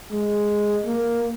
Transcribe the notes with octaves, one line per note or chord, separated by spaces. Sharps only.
G#3
A#3